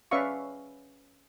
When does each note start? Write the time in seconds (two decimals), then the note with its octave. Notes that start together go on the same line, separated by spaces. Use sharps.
0.11 C#4 B4 D5 E5 F5 C#6